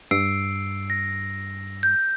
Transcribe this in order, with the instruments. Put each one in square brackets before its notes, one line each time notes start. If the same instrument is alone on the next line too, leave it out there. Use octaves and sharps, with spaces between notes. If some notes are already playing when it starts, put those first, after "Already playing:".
[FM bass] G2 [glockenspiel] E6 C7 D7
[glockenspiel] A#6
G6